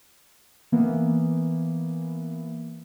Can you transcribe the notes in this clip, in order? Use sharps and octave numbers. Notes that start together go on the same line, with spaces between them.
E3 A#3 B3